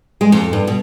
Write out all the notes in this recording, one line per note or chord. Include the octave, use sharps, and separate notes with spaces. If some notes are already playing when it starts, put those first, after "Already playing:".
G#3
F2
G2
B2